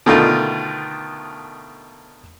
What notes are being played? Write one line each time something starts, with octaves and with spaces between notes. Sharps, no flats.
B2 D3 D#3 A3 F4 A#4